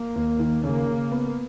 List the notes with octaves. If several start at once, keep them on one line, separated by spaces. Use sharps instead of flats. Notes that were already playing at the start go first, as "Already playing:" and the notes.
Already playing: A#3
D#2
D#3
C#3 A#3
C#3
B3